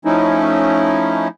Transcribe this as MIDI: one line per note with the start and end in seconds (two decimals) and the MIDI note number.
0.05 1.28 53
0.05 1.28 57
0.05 1.28 61
0.05 1.28 63
0.05 1.28 64